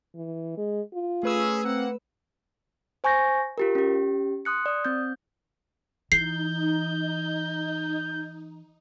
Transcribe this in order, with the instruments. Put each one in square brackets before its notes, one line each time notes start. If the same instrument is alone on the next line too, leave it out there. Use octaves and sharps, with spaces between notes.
[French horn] E3
G#3
F4
[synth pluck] A3 B4 E6 [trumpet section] C#4 G#4
[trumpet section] A#3 F#5 [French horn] C4
[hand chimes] C5 G#5 C#6 G6 A#6
F4 G4 A#4
C#4 G4
C6 D#6 F#6 C#7
D5 D#6
C4 G6
[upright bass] E3 [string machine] D#4 [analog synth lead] G6 [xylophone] C7